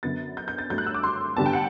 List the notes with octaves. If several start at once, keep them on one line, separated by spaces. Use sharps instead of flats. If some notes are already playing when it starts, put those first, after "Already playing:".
F#2 D3 F#3 B3 A6
G6
G6
A6
G2 F#3 A3 G6
F#6
E6
D6
C6
G2 D3 G3 B3 A5
G5
F#5